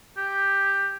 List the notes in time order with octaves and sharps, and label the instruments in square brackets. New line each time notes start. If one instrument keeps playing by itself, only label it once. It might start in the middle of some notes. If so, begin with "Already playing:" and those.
[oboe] G4